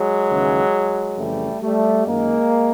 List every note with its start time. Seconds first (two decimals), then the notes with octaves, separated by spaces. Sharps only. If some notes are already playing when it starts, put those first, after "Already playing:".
Already playing: F#3 G#3
0.29 D#2 C#3 E3
1.17 F2 C#3 E3 G3 A3
1.61 G3 A3
2.05 F#2 D#3 G#3 A#3